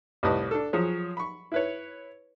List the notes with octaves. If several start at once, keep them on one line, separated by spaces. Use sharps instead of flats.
C2 A2 B4 D#5 A5
D4 A4
F3 F#3 G#4 C#5
B5 C#6
E4 B4 C#5